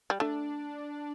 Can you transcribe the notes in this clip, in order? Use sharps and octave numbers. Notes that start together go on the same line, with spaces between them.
G3
A3 D4